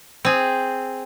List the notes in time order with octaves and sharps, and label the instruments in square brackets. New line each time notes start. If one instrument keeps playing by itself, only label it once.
[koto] C4 G#4